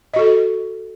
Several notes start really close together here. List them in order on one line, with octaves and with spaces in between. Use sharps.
D#5 F#4 A4